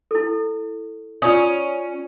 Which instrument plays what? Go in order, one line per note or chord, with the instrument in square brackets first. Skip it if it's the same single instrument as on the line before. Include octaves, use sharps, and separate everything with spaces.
[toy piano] E4 A4
[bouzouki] C#4 [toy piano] F4 D5 D#6